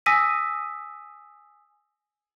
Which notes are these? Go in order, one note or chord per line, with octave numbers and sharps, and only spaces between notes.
G#5 D#6 E6 A#6 B6 D#7